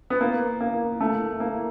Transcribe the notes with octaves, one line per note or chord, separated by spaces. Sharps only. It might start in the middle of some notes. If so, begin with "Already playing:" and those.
B3
A#3
A#3
A3
A#3